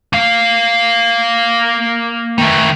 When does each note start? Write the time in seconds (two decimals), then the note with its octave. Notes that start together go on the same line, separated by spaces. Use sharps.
0.13 A#3 F5
2.38 D#3 A3